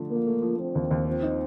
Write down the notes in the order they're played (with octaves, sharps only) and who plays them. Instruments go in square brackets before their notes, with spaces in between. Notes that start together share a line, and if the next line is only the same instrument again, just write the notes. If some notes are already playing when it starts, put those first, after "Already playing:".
Already playing: [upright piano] D3 F3 A3
[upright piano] F3 [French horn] A#3
[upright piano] A3
F3
[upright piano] F3 [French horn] C4
[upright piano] D#2
D#2
[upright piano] F3 [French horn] C4
[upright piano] D#4